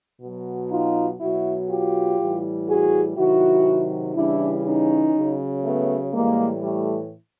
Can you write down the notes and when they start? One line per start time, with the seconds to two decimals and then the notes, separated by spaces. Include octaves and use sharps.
0.21 B2 F#3
0.71 D#4 F4
1.20 B2 F#3 E4 F#4
1.69 F4 G4
2.19 A2 E3 G3
2.68 F#4 G#4
3.17 C3 D#3 F#3 E4 F#4
4.16 C#3 E3 G3 D4 E4
4.65 C#4 D#4
5.15 C#3 F#3
5.64 A3 B3
6.13 A2 E3 G3 G#3 A#3
6.62 G3 A3